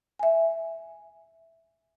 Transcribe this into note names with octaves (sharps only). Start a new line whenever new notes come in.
E5 G#5